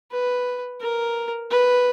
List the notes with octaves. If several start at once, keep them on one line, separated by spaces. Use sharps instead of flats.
B4
A#4
B4